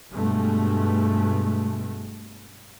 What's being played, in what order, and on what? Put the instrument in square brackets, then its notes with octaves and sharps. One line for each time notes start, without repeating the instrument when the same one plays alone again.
[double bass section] G2 B2 G#3 A3